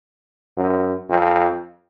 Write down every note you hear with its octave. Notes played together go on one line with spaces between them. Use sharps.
F#2
F2